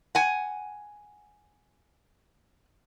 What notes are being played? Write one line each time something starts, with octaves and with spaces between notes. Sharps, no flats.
F#5 G#5